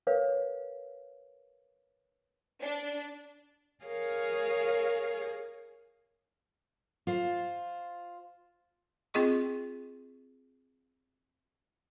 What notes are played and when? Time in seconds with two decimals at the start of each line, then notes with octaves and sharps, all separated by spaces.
0.07 A#4 B4 C#5 F5
2.62 D4
3.84 G#4 A#4 C#5 F5
7.07 F4 C5
9.14 C4 F4 G#4 D#5 C#6